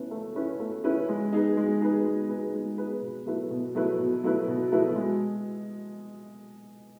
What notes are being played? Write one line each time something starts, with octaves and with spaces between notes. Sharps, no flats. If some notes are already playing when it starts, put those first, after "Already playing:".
Already playing: A3 C#4 E4 B4
A3
C#4 E4 B4
A3
C#4 E4 B4
G#3
D#4 G#4 B4
G#3
D#4 G#4 B4
G#3
D#4 G#4 B4
G#3
D#4 G#4 B4
B2
F#3 A3 E4 B4
B2
F#3 A3 E4 B4
B2
F#3 A3 E4 B4
B2
F#3 A3 E4 B4
G#3